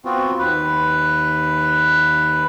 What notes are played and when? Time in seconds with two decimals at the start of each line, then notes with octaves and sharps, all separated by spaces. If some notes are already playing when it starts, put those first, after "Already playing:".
0.05 B3 C4 F4 F#4
0.39 D#2 B4